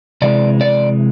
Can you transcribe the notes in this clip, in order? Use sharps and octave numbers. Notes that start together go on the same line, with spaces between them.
C3 E3 G#3 D5
D5